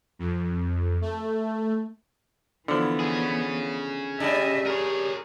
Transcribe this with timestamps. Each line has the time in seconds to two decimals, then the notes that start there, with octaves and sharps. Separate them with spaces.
0.19 F2
1.02 A3
2.68 D3 E3 F3 B3 E4
3.00 C#4 G#4
4.20 C#3 G3 D4 D#5 E5
4.66 G#4 A#4 C#5